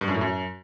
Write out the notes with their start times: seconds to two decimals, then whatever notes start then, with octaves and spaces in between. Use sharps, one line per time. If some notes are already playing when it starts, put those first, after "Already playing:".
0.01 G2
0.08 F#2
0.14 A2
0.21 F#2